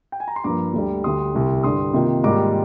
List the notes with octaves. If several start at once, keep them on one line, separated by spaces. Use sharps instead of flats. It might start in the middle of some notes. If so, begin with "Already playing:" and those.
G5
G#5
A#5
C6
G2 F3 A#3 A#5 D6
D2 D3 G3
D2 D3 G3 C6 D#6
C2 C3 G3
G2 D3 G3 C6 D#6
C3 D#3 A#3 F4
G#2 D#3 G3 A#3 F4 A#5 D6